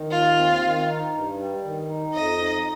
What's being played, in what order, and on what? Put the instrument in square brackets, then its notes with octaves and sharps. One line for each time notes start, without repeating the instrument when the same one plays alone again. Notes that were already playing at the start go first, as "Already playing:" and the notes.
Already playing: [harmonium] D#3
[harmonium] D#2 [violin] F4
[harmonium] C4
D#3
D#4
G2
G3
D#3
D#4
[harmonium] F2 [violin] D#5
[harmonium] D#4